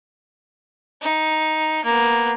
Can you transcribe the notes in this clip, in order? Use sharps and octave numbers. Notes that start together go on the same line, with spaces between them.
D#4
A#3 B3